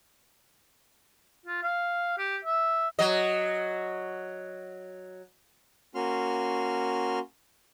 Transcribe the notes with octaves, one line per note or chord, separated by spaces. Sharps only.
F4
F5
G4
E5
F#3 D#5
A#3 C#4 F#4 C6 F6